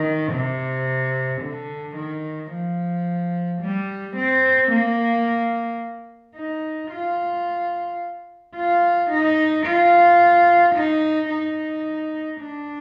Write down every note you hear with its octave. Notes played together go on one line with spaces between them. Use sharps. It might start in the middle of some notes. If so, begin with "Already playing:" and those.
Already playing: D#3
C3
D3
D#3
F3
G3
C4
A#3
D#4
F4
F4
D#4
F4
D#4
D#4
D4